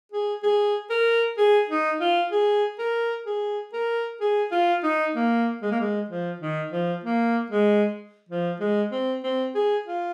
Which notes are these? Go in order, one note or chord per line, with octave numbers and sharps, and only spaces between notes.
G#4
G#4
A#4
G#4
D#4
F4
G#4
A#4
G#4
A#4
G#4
F4
D#4
A#3
G#3
A#3
G#3
F3
D#3
F3
A#3
G#3
F3
G#3
C4
C4
G#4
F4